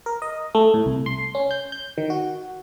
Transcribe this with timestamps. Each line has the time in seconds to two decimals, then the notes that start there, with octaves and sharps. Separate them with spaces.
0.06 A#4
0.22 D#5
0.55 A3
0.74 A2
0.86 C2
1.06 C6
1.35 C#4
1.51 G6
1.72 G6
1.98 D#3
2.10 F#4